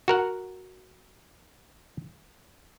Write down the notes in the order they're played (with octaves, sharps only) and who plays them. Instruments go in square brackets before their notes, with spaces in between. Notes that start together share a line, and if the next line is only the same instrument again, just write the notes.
[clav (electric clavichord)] F#4 A#4 F#5